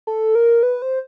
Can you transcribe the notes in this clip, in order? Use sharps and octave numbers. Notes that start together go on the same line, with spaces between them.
A4
A#4
B4
C5